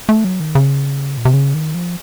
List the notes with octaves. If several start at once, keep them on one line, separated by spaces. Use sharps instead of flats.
A3
F#3
D#3
C#3
A#2
C3
C#3
D#3
F3